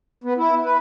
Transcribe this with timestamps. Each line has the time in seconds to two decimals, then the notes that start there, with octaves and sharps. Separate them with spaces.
0.24 B3
0.38 E4
0.64 B4